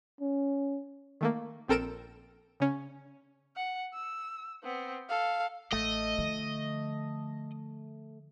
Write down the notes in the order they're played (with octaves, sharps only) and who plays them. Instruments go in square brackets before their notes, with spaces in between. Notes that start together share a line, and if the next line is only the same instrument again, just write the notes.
[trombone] C#4
[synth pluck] D#3 A3 A#3
A#1 C4 A4 A#4 D7 E7
C#3 C#4
[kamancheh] F#5
E6
B3 C4
A4 F5
[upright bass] A1 [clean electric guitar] A3 [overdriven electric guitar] D#5
[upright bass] D3 F3